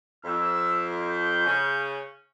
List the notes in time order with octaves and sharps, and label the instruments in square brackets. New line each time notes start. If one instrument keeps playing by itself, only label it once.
[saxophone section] F2 [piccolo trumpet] E6
[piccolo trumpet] G6
[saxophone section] C#3 C#4